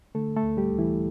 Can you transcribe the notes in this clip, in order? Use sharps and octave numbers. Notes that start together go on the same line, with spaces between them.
D3 A3 A4
A3 A4
D2
G3 G4
D2
E3 E4